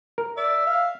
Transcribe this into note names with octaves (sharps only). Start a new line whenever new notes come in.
A#4
D5 E5
F5